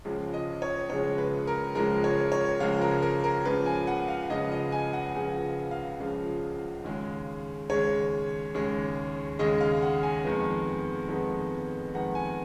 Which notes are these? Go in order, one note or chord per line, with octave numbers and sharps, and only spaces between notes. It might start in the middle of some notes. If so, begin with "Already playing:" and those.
C#2 C#3 F3 G#3
D#5
C#5
C#2 C#3 F3 G#3 C#5
B4
A#4
C#2 C#3 F3 G#3 A#4
C#5
C#5
C#2 C#3 F3 G#3 F5
A#4
A#4
A#4
C#2 C#3 F3 B4
G#5
F#5
F5
C#2 C#3 F3 D#5
D#5
G#5
F#5
C#2 C#3 F3 G#5
F5
C#2 C#3 F3
D#2 C#3 G#3
D#2 C#3 G#3 C#5
D#2 C#3 G#3
D#2 C#3 G#3 D#5
F5
F#5
G#5
F2 D#3 G#3 B3
F2 D#3 G#3 B3
F2 D#3 G#3 B3 F#5
G#5